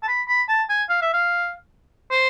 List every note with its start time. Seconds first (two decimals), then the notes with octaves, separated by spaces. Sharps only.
0.03 A5
0.08 B5
0.28 B5
0.49 A5
0.69 G#5
0.89 F5
1.02 E5
1.14 F5
2.11 C5